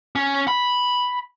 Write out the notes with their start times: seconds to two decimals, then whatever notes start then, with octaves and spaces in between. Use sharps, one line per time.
0.16 C#4
0.48 B5